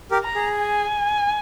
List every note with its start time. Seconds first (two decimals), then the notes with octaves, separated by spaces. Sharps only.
0.11 G4 A#4
0.23 A#5
0.35 G#4
0.59 G#5